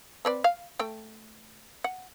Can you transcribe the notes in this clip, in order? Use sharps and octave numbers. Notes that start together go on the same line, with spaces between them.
C4 B4 D5
F5
A3 G5
F#5